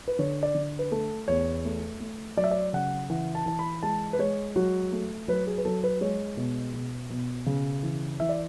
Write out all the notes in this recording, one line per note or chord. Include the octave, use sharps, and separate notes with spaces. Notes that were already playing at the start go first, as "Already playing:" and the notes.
B4
D3 C#5
D5
D3
B4
A3 A4
E2 C#5
A3
A3
F#3 D5
E5
D5
C#3 F#5
E3 F#5
A5
E3 A5
B5
G#3 A5
B4
G#3 C#5
F#3 F#4
A3
F#3 B4
G#4
B4
F#3 A4
B4
G#3 C#5
B2
B2
B2
C#3
E3
E3 E5
D5